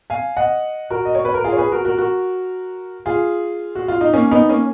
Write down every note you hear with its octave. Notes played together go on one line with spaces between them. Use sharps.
F5 G#5
D#5 F#5
F#4 A#4
D#5
C#5
B4
A#4
F4 G#4
C#5
G#4 B4
F#4 A#4
F#4 A#4
F#4 A#4
F4 G#4
F#4
F4
D#4
A#3 C#4
B3 D#4
A#3 C#4